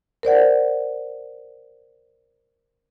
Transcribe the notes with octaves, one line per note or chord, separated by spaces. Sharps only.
A#4 C5 D5 F#5